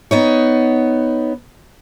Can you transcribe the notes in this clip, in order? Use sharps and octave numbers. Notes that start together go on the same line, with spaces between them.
B3 D#4 C#5